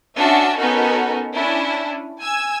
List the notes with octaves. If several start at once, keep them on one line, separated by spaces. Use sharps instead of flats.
C#4 D4 F#4 E5 A5
B3 C#4 D#4 F#4 A4 A#4
C#4 D4 E4
G#5 E6 G#6